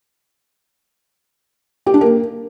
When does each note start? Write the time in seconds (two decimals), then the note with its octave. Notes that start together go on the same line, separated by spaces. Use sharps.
1.86 G4
1.94 D4
2.01 A#3